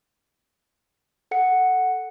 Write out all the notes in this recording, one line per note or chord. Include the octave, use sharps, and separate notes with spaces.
A4 F#5 C#7